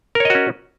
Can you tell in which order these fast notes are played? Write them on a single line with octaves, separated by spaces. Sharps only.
A#4 C#5 D#5 F#4 C#4